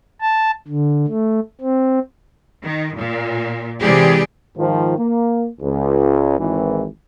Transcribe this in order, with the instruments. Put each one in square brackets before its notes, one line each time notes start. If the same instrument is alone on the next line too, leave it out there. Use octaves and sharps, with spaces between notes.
[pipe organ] A5
D3
A3
C4
[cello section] D#3
A#2
C3 E3 G#3 G4 G#4 D5
[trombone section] G#2 D#3 F3
A#3
C#2
G#1 E3